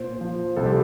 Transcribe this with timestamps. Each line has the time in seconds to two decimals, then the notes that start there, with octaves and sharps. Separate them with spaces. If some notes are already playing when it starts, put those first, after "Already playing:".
Already playing: A#2 C5
0.21 F3
0.56 C2 A4
0.66 G4